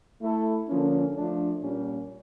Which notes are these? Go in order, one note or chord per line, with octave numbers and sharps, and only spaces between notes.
A3 E4 A4
D3 F3 A#3 C#4
F3 A3 D4
A#2 G3 A#3 C#4